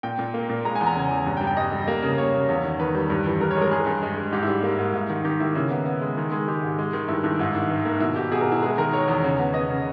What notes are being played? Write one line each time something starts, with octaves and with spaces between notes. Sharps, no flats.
A#2 G5
A#2
A#3
A#2
G#3 A#5
G#5
E2
A#5
C#3
E2
G2
G5
G3
G5
G2 D#5
G3
A#3
C#3
A#3 C#5
C#3
E2
D#3
D#3 B4
G3
G2
E3
G2 A#4
C#5
G#3 A#4
G2 G#4
G2
G#3
G#3
G#2 G4
E4
G3
A#3
G#2
G#2
D#3
D#3 G4
A#3 E4
C#3 E4
B3
B3
G#3
D#3
G#3
G#3 G4
G#2
G#3
D#3
G2 E4
G2 E4
G#2 E4
D#3 E4
D#3
A#3
B2 E4
B2 G4
B2 G#4
A#4
B3
E4
G#3 G#4
D#3 A#4
G#3 C#5
E2
C#3
B3
B3 D#5
C#3